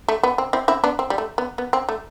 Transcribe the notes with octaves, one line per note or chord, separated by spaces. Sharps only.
A3
B3
C4
C4 E4
C4 E4
B3 D4
C4
G3
A3
B3
B3
C4
A3